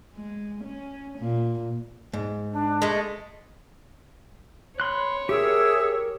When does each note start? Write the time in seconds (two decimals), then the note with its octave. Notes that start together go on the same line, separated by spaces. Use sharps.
0.14 G#3
0.64 C#4
1.19 A#2
2.13 G#2
2.53 D4
2.82 G#3 A3
4.80 C#5 B5 C6 F#6
5.29 G4 G#4 A#4 E5 C#6 E6